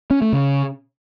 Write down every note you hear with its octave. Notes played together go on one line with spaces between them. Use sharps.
C#4
A3
C#3